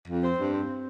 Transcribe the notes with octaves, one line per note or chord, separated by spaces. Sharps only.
F2
C4
G2
C4